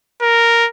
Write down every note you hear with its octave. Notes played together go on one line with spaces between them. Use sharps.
A#4